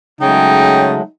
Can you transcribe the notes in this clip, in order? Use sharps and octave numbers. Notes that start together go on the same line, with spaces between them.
C#3 F#3 G#3 A3 D#4 G5